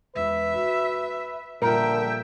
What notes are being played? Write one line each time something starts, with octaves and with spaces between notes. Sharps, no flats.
E1 B4 E5
F#4
A#2 D3 F3 G3 A#4 E5 G5